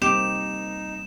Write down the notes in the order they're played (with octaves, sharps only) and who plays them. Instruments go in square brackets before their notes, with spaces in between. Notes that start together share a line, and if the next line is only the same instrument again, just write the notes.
[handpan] G3 A#3 C4 [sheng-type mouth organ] D#4 [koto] G4 [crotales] E7